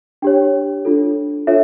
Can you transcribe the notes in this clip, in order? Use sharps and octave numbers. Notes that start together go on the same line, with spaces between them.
D4 G4 C#5 G5
D4 F4 A4
D4 F4 A4 C#5 E5